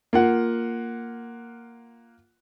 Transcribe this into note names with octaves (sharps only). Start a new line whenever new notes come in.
A#3 F4 F#5